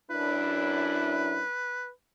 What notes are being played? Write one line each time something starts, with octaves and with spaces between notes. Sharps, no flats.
F#2 D4 E4 B4